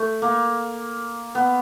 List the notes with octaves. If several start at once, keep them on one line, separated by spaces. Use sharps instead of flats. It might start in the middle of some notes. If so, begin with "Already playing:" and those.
Already playing: A3
A#3
B3